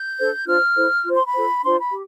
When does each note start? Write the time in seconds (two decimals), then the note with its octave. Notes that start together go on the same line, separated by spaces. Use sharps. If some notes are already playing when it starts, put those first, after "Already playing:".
Already playing: G6
0.18 D4 A4 C5
0.46 D4 F4 C5 F6
0.76 E4 A4 C5
1.04 F4
1.09 C5
1.15 C6
1.24 B5
1.34 F4 A4 C5
1.63 D4 F4 C5 C6
1.78 B5
1.92 G4